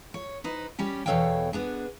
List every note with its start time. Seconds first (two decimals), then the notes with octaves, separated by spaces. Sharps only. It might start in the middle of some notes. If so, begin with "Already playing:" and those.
0.14 C#5
0.44 D#4 B4 C5
0.79 G3 C#4 G4
1.06 E2 B2 A4 C#5 F5 G5
1.53 B3 D4 G#4